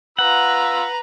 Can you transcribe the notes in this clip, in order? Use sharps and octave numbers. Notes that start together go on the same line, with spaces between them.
F4 B4 F#5 A#5 E6